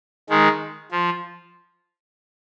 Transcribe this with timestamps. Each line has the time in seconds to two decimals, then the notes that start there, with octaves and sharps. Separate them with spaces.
0.29 D#3 G#3
0.92 F3